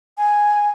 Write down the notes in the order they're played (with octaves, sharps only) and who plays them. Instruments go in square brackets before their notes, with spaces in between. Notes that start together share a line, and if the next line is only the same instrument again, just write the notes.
[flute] G#5